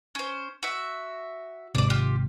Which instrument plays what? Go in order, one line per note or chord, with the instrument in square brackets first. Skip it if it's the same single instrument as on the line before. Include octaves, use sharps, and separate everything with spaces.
[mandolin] C#4 C5
F#4 E5
[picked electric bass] G#1 G#2 C3 [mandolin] D4 D5
[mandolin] F4 G4